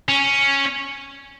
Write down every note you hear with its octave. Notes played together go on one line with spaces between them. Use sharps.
C#4